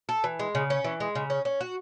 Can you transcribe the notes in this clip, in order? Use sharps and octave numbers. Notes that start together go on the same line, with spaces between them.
A4
E3
G#3
C#3
C#4
E3
G#3
C#3
C#4
C#4
F#4